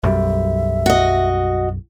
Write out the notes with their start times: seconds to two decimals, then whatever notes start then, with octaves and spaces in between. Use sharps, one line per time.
0.04 B1 F#2 G3 E5
0.86 F#4 D#5